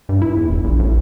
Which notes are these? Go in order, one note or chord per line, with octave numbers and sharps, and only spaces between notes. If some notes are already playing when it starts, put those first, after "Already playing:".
G2
E4
E2
D#1
A#1
A1